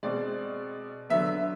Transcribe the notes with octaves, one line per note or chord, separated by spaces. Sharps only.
B2 G#3 C4 D5
D3 F#3 B3 E5